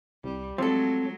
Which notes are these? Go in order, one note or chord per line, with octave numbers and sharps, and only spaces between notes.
C2 G3
F3 F#3 G#3 A3 C4 A4